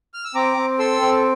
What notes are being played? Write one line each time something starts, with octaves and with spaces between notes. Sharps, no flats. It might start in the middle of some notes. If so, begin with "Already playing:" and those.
F6
E6
C4 A#5 D6
C4
A4 C6 E6
C4